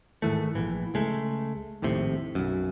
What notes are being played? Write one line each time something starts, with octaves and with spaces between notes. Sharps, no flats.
G#2 D#3 E3 A3
A#1 E3
C#2 G#3 A3
A#1 D#2 A2 C3
B1 F#2